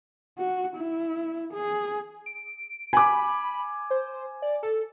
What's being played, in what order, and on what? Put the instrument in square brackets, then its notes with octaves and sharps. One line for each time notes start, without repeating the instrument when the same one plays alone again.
[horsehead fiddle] F#4
E4
G#4
[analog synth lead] D7
[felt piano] G#5 D6 [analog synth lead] B5
[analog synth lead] C5
D5
A4